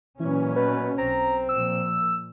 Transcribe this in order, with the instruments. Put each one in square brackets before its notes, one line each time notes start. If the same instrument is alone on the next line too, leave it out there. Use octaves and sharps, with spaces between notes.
[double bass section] A#2 F#3 C#4 [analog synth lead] E3
[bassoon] B2 [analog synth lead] B4
[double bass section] B1 [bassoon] C4 [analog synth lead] A#5
[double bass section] A#2 F3 [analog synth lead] E6